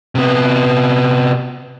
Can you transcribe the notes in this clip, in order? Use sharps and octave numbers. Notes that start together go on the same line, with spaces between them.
C3 B3